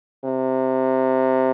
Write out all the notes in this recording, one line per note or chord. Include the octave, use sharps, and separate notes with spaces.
C3